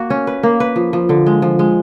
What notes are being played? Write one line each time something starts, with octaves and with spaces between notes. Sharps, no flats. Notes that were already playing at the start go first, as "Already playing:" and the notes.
Already playing: A#3 F#4
C#4
B4
A#3
B4
F3
F3
D3
G#3
F3
G#3